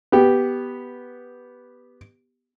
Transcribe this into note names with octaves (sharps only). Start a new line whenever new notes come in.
B3 G4